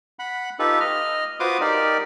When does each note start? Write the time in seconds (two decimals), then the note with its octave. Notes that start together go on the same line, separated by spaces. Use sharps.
0.19 F#5 B5
0.59 D#4 F4 G4 A4 B4
0.80 D#5 F6
1.40 F4 F#4 B4 C5 D6 D#6
1.61 D#4 G4 A#4 D5